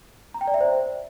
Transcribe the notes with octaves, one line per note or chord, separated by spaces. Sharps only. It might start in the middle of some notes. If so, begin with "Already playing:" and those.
A#5
G5
D5
E5
C5